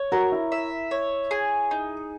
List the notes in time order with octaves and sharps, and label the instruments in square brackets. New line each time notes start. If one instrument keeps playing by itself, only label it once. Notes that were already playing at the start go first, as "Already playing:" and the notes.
Already playing: [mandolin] C#5
[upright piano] F#4 [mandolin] A#4
[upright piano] E4
[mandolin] E5
C#5
G#4
D#4